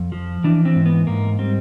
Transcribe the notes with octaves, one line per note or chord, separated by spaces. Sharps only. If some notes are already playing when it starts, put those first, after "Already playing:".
Already playing: F2
F3
E3 D4
C4
G#2
B3
G#2 A#3
G3 C4